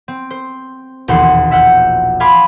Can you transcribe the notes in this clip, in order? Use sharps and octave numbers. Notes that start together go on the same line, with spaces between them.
C4
C5
E1 A#1 D#2 C5 F#5 C6
E5 F#5 F#6 G6
F5 G#5 B5 C6 D6